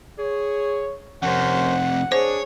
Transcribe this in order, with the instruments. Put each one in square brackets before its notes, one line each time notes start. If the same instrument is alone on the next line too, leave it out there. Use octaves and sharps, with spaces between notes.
[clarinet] G#4 [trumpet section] C#5
[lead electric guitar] F2 C3 [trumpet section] C#4 A#4 C5 [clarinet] F#5
[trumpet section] D4 G#4 [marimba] C5 [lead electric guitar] C#5